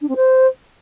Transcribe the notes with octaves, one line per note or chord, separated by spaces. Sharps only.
D4
C4
C5